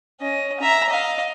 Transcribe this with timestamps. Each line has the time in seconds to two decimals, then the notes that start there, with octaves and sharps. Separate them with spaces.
0.21 C#4 D#5
0.60 E5 A#5
0.89 D#5 F5